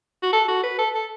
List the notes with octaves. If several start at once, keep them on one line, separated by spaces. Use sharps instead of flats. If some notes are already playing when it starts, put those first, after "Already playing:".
F#4
A4
F#4
B4
A4
A4